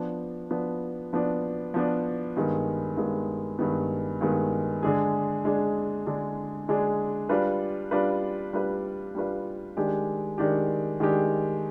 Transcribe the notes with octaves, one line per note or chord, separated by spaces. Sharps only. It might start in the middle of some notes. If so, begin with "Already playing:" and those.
Already playing: F3 B3 D4
F3 B3 D4
F3 B3 D4
F3 B3 D4
G2 D#3 G#3 B3
G2 D#3 G#3 B3
G2 D#3 G#3 B3
G2 D#3 G#3 B3
D3 G#3 D4 G#4
D3 G#3 D4 G#4
D3 G#3 D4 G#4
D3 G#3 D4 G#4
G3 D4 F4 B4
G3 D4 F4 B4
G3 D4 F4 B4
G3 D4 F4 B4
D#3 G#3 D4 G4
D#3 G#3 D4 G4
D#3 G#3 D4 G4